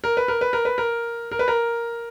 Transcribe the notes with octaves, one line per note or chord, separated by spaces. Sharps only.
A#4
B4
A#4
B4
A#4
B4
A#4
A#4
B4
A#4